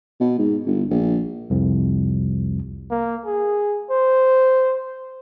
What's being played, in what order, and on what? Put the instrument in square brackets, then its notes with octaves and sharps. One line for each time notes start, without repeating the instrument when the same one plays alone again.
[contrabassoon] B2
G#2
G1
A#1
[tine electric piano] C2 F2
[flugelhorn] A#3
G#4
C5